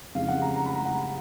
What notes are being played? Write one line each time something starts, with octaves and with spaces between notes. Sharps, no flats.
F2 C#3 G#3 F5
F#5
A#5
A#5
B5
A#5
F#5